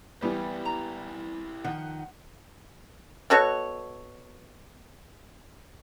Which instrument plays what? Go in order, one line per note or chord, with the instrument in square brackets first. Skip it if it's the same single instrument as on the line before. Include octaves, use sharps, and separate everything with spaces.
[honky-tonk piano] E3 G3 [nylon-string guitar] B3 [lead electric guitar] E4 G4
[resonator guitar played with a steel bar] A#5
[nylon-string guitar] D#3 [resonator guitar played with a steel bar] F3 [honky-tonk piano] F#5
[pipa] B2 F#4 A4 C#5